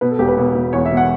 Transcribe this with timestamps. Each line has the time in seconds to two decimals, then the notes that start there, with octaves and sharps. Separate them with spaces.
0.01 B2 B4
0.11 A4
0.19 E1 G4
0.28 B4
0.38 B2
0.55 B2
0.73 E2 C#5
0.86 E5
0.90 B2
0.97 F#5